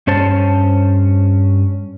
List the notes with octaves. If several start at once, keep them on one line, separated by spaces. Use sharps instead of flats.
G2 C#4 C5 A5